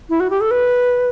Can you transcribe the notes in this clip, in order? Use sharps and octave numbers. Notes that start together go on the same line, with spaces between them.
E4
F#4
G4
A4
B4